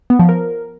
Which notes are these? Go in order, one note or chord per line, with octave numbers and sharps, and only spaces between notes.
B3
F3
A#4